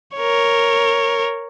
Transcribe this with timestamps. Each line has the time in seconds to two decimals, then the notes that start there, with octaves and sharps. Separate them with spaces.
0.17 A#4 C#5